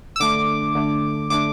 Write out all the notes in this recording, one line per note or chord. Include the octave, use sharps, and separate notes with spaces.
E6
D3 A3 D4 D6
D3 A3 D4
D3 A3 D4 D6